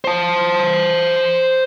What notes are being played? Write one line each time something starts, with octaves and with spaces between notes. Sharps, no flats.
C5 A5